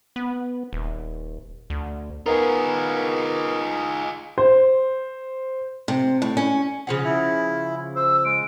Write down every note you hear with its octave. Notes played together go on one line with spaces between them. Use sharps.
B3
D#1
D2
B3 D#4 F4 G#4 A#4
C5
C3
A2
C#4
C#3 F3 F#5
E4
C5 E6
G#3 D7